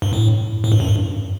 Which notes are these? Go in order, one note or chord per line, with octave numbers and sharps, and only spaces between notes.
G2
A2
A2
G2
F#2
G2